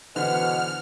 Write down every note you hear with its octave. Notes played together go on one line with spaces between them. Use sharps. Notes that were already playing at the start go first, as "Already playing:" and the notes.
B2 D3 E3 C5 F#5 F6